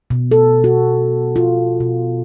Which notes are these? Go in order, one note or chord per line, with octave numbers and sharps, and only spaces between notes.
B2
A4
F#4
F4
B2